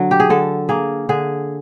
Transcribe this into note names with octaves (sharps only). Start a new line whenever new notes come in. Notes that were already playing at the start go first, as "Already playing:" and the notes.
Already playing: D3 F#3
G4
G#4
D3 A4
A#3 G#4
D3 G#4